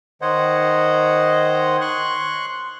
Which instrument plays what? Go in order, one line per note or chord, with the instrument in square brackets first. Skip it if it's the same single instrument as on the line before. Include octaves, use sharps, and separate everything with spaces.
[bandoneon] D#3 C5 C#5 D#5 F#5
C6 C#6 F#6